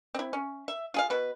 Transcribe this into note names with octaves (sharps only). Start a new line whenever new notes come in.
C4 E4
C#4
E5
F4 G#4 F5
B2 B4